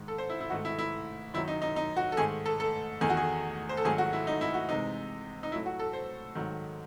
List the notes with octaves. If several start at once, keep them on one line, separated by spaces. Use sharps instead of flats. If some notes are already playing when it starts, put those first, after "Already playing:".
Already playing: G#2 D#3 G#3
A4
C5
E4
E4
G#2 D#3 A3 F#4
E4
E4
F#2 D#3 F#3 E4
D#4
D#4
D#4
F#4
A4
G#2 D#3 A3 G#4
A4
A4
E2 D#3 A3 G#4
F#4
G#4
C5
A4
G#2 D#3 F#3 A3 G#4
F#4
E4
D#4
E4
F#4
C3 E3 G#3 D#4
D#4
A2 F#3 A3 E4
F#4
A4
C5
G#2 D#3 F#3 A3